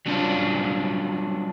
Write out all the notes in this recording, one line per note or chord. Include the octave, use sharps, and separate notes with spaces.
F#3 G3 C#4 D4 F4